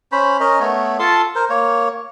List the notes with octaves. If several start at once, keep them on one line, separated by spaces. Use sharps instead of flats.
C#4 C5 B5
C#4 A#4 D#5
A3 B3 C#5
F4 A4 A5 C6
A#4 C5
A#3 C#5